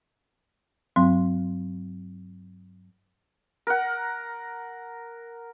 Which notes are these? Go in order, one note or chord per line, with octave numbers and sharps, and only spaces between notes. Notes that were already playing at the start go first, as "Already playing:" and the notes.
G2 F#3 C4 C6
A#4 F#5